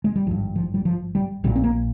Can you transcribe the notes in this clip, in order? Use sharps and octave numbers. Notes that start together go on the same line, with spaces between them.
G#3
G3
G#1 G2 F3
F3
G3
F3
G3
A#1 A#2 G3
C4
A#3